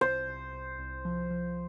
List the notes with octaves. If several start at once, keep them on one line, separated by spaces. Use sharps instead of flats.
C2 C5
C2
C2
C2
F3
F3